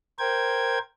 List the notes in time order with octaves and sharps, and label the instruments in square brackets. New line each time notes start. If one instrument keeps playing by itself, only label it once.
[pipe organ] A#4 C5 G5 G#6